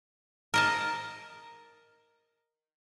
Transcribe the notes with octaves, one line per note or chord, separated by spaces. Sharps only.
A#4 D#5 A5